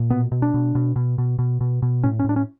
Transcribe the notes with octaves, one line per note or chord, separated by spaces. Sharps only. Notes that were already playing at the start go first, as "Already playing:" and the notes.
Already playing: A#2
B2 B3
B2
D4
B2
B2
B2
B2
B2
B2
B2
A2 C#4
C#4
A2 D4
C#4